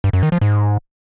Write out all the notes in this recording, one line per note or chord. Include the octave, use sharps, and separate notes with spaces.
G2
F#2
D#3
F3
G#2